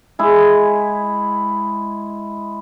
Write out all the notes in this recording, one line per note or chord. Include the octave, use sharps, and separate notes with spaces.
G#3 E4 G#4